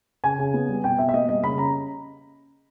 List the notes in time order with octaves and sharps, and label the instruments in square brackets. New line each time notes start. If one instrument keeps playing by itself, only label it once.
[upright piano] C#3 G#5
C#3
B3
G3
B2 G5
B2 E5
E5
A#3 D#5
G3 D#5
C#3 B5
C#4 A#5